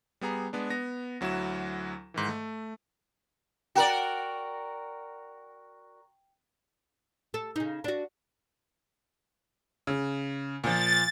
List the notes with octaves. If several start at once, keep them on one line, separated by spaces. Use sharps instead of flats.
G3 B3 G#4 A#5
G#3 B3 D4
B3 A#6
D2 F#3 E4 F#4 E7
G#2 D#3 E3
A3
F#4 A#4 D5 G5 F#7
A4
C#3 D#4
D4 F#4
C#3
A#2 F3 A6